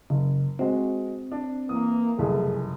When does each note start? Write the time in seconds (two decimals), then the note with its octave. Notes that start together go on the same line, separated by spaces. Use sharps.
0.10 F#1 C#3
0.59 G#3 C4 F#4
1.32 D4
1.69 E3 A#3 D#6
2.18 F#1 C2 F2 A3 G#4